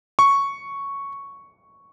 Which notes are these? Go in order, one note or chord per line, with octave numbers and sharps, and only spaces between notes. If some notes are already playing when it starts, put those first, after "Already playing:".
C#6